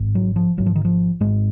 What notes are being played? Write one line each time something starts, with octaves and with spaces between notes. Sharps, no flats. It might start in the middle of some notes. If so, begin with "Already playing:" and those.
Already playing: G#1 G#2
F#3
F3
G#1 G#2 F#3
F3
D#3
F3
G#1 G#2 G#3